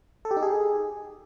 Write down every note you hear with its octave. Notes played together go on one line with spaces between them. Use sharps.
A4
G4
D#4
G#4